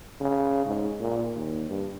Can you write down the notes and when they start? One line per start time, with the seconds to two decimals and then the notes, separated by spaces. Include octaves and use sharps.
0.20 C#3
0.66 G#2
1.00 A#2
1.36 D#2
1.69 G2